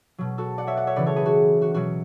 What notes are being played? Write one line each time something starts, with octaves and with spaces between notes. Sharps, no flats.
B2 F#3
F#4 A4
D5 F#5
C#5 E5
D5 F#5
C#5 E5
C#3 E3 B4 D5
A4 C#5
G#4 B4
F#4
F#4
B2 F#3 F#4